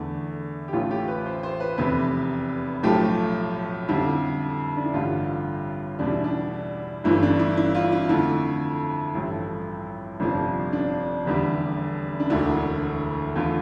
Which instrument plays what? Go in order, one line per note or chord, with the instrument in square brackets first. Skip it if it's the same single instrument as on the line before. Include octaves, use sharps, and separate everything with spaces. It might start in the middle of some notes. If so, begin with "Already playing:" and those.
Already playing: [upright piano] E2 D3 A3
G4
A1 A2 E3 A3 F4
G4
B4
C5
C5
B4
F1 E2 C3 B4
B1 A2 F3 A3 G4
F2 D3 G3 E4
D4
E4
A1 G2 D3 G3 F4
E2 B2 G3 D4
E4
D4
G1 G2 E3 A3 E4
D4
E4
E4
F4
E4
F2 D3 A3 E4
A1 G2 F3 E4
G1 F2 C3 F3 D4
D4
F1 E2 D3 G3
D4
E1 D2 D3 E4
E2 D3 A3 F4